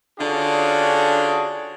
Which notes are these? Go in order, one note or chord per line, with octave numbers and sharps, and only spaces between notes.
D3 C#4 D4 F4 F#4 G#4